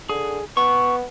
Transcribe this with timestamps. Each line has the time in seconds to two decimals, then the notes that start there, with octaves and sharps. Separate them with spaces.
0.09 D3 G#4
0.57 B3 C#6